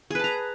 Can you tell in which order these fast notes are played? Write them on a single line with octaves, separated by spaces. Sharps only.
G#4 B4 A5 A#5